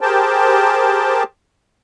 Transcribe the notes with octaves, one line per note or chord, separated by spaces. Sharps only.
G4 G#4 A#4 C5 G5 A5